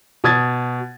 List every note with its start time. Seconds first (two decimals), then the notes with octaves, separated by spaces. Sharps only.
0.24 B2 D#6 G#6 A6